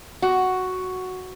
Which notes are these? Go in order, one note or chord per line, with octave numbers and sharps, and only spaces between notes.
F#4